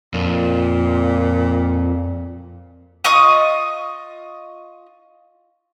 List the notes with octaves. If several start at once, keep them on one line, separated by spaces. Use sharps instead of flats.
F2 A#2
F4 D#5 C#6 D#6